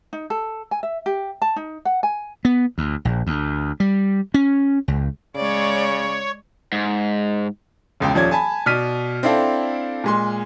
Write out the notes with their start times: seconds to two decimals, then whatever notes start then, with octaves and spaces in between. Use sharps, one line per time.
0.13 D#4
0.30 A4
0.71 G#5
0.83 E5
1.06 G4
1.42 A5
1.56 D#4
1.85 F#5
2.03 G#5
2.45 B3
2.78 D2
3.05 A#1
3.27 D2
3.80 G3
4.34 C#4
4.88 C#2
5.36 C#3 G#3 C#5 D5
6.72 G#2
8.00 E1 C#2 G5
8.14 D#1 F3 C#4 D5 G#6
8.31 G#5 A5 B5
8.66 B2 D5 F6 B6 D#7
9.23 C4 D4 E4 A4 F5 G5
10.04 A#2 G#3 C6